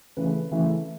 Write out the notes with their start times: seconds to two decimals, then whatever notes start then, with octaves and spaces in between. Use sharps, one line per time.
0.17 C#3 E3 A3 E4 B4
0.52 C#3 E3 A3 E4